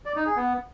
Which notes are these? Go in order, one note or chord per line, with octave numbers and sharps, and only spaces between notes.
D5
D#4
G#4
B3